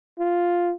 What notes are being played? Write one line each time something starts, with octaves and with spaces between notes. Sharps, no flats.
F4